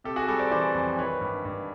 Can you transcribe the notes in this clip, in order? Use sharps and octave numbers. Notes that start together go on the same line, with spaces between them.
C3 G4 A4
F#4 G#4
G3 G4 A4
C5 D5
E3 C5 D5
F2
D#3 B4 C#5
G2
G2